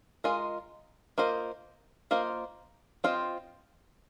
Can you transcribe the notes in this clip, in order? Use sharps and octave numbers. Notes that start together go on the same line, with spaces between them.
G#3 F4 A#4 D#5
A#3 F4 C5 D#5
A#3 F4 C5 D#5
C4 F4 C5 D#5